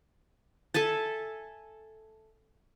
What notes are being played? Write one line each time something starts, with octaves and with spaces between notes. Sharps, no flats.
A4 E5 G#5 A5